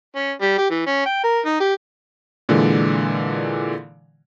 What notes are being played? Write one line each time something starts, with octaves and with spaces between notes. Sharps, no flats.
C#4
G3
G4
E3
C#4
G5
A#4
D#4
G4
A#2 D3 E3 G#3